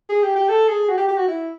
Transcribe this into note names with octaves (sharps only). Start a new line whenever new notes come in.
G#4
G4
G4
A4
G#4
F#4
G4
G4
F#4
E4